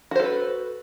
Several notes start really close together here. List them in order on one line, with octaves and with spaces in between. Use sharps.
F#4 C5 A4 B4